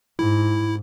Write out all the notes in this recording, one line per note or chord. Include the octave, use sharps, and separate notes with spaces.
G#2 E4